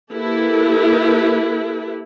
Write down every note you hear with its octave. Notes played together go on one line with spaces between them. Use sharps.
A#3 E4 G4 A4 B4